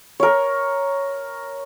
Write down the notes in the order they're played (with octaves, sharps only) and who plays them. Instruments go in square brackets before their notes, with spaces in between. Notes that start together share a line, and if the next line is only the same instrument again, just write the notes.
[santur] A#4 C#5